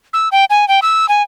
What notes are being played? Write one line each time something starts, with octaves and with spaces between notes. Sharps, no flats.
E6
G5
G#5
G5
E6
G#5